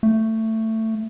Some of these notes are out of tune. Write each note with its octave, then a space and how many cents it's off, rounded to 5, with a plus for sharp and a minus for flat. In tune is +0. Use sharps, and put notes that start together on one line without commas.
A3 +15